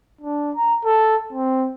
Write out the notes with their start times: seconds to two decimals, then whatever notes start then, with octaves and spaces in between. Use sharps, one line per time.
0.21 D4
0.56 A#5
0.85 A4
1.33 C4